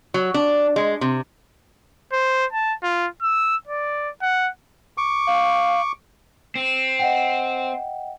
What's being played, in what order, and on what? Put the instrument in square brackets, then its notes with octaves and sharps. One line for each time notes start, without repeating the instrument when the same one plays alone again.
[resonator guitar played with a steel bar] F#3
D4
G#3
C3
[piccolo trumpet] C5
A5
F4
E6
D5
F#5
[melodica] C#6 D6
[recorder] F5
[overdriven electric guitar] C4
[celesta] D#5 F#5 G5